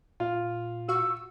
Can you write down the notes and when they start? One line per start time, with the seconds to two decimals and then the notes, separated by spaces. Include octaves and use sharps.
0.20 A#2 F4
0.89 F#4 F5 C#6 E6